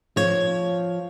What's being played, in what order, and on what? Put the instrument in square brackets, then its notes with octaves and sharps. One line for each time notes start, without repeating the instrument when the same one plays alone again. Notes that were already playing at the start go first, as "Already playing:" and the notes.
[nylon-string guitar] F3 C#5